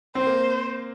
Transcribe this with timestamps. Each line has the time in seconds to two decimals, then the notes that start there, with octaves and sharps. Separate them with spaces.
0.15 C4 C5
0.27 A#3